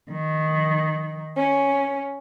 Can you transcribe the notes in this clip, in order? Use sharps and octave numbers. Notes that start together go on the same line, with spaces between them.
D#3
C#4